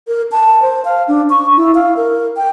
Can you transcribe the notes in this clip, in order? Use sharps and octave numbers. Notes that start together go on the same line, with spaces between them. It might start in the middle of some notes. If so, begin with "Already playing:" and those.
A#4
A5
C5
F5
D4
C#6
E4
F5
A#4
G5